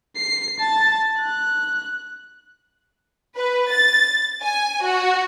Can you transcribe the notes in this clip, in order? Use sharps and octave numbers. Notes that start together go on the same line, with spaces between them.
C7
A5
F#6
B4
A6
G#5
F#4